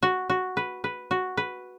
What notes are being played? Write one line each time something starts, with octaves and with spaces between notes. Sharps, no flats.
F#4
F#4
B4
B4
F#4
B4